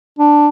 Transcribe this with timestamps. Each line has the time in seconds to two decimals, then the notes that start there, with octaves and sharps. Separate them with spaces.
0.19 D4